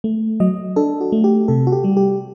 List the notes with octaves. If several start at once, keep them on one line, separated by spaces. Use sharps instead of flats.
A3
F#3 D#5
D4 A4
F#4
A3
G4
C3 A4
F#4
G4
G3
G4